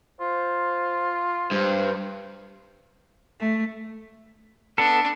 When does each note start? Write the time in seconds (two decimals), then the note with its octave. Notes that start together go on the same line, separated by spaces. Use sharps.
0.20 F4 C5
1.51 G2 C5
3.40 A3
4.78 B3 D4 A4